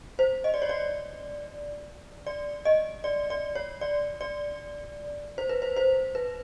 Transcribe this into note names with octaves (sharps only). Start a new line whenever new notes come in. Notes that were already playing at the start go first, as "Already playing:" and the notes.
C5
D#5
D5
C#5
D5
D5
D#5
D5
D5
C#5
D5
D5
C5
B4
C5
C5
B4